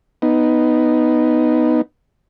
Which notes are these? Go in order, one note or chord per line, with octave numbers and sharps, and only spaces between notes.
B3 D#4